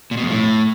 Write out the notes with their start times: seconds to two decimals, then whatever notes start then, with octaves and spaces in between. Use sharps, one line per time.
0.11 A#2
0.17 B2
0.23 F2
0.29 A2